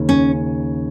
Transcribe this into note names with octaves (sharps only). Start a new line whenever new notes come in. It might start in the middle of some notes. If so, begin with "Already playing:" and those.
Already playing: D#2 C#3
C#4